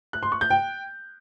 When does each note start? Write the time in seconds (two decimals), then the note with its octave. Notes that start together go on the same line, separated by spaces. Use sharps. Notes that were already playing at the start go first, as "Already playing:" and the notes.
0.13 F#6
0.23 C6
0.32 C#6
0.41 G6
0.50 G5